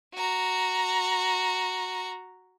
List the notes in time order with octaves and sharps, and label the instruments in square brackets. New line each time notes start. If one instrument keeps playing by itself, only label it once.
[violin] F#4 A#5